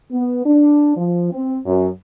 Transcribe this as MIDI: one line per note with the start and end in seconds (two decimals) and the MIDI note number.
0.12 0.45 59
0.45 0.95 62
0.96 1.30 53
1.32 1.58 60
1.66 1.88 42